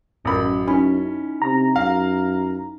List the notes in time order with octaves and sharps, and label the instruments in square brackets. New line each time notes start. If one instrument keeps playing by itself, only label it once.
[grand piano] A1 A#4 B5 [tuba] F#2
[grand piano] C#4 [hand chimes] D#4 E4 B5
[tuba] C3 [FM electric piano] A#5
[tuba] F#2 [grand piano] F5